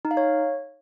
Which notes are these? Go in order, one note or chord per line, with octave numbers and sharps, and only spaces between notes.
D#4
F5
C#5